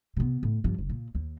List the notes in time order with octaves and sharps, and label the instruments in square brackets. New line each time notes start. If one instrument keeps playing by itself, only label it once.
[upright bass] C3 B3
A2
G2 F3
F#1
A#2
D#2